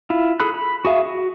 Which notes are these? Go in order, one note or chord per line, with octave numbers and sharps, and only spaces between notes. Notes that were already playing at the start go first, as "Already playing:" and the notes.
E4 F4
G#4 A4 B5 F#6
B5
F#4 G#4 E5 F5
F#4